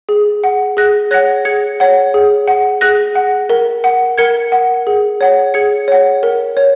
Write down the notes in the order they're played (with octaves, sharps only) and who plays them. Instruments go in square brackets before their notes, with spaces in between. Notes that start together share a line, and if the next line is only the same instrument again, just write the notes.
[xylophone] G#4
F#5
G#4 F#6 A#6
C#5 F#5 F#6 A#6
G#4 G#6 C#7
C#5 F#5
G#4
F#5
G#4 F#6 A#6
F#5
A#4
F#5
A#4 G#6 C#7
F#5
G#4
C#5 F#5
G#4 G#6 C#7
C#5 F#5
A#4
C#5